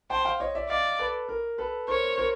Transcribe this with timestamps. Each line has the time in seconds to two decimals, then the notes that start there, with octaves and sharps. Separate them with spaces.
0.10 C5 G5 A5
0.25 F5 G5
0.40 C#5 D#5
0.55 D5 E5
0.69 D5 D#5 F5
0.99 A4 B4
1.29 A#4
1.58 A4 B4
1.88 A#4 C5 C#5
2.18 A#4 C5